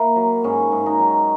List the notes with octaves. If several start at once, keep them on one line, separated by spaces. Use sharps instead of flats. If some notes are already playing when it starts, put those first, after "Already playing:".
Already playing: A#3 E4
F#3
G#2 C#4
G#2
D#4
F#3